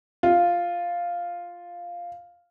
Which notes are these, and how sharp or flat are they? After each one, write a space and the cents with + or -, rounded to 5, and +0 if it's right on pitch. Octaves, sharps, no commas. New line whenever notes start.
F4 +0